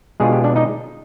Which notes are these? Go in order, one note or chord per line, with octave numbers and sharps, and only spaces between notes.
B2 G#3 D4 F4 G#4
G4
D4 D5
D#4 D#5